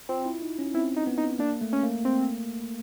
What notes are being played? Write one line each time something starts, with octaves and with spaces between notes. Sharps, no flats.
C4 F4
E4
D#4
C#4
C4 E4
D#4
B3
D#4
A#3 D4
A3
C#4
A#3
C4